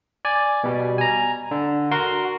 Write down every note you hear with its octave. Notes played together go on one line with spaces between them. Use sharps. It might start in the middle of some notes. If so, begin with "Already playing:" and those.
D5 G#5
B2 G3
G#5 A#5
D3
F#4 A#4 C6